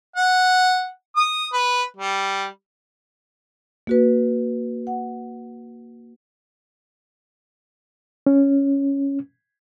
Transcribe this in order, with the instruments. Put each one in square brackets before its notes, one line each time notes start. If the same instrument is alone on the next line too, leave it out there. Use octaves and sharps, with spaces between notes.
[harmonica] F#5
D#6
B4
G3
[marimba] A#3 F#4 B4
F#5
[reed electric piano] C#4